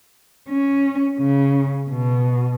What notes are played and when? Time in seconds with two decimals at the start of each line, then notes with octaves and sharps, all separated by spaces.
0.50 C#4
1.20 C#3
1.90 B2